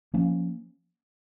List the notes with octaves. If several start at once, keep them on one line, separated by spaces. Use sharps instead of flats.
F3 A#3 C#4